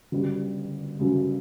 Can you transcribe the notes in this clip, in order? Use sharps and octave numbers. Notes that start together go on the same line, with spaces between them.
G1 F#2 C#3 G3
G1 F#2 C#3 G3